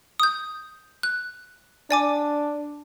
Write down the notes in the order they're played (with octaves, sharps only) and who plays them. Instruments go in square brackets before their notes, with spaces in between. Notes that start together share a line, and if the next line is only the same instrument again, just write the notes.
[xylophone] D#6 G6
F#6
[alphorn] D4 [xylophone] D5 G#5 D6